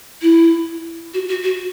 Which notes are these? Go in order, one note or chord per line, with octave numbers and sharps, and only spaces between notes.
E4
F#4
F#4
F#4